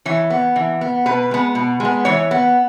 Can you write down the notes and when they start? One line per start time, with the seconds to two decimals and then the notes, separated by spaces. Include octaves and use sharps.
0.05 E3 C#5
0.30 B3
0.56 E3
0.81 B3
1.06 B2 B4
1.31 G#3 B3
1.55 B2
1.80 G#3 B3
2.05 E3 C#5
2.31 B3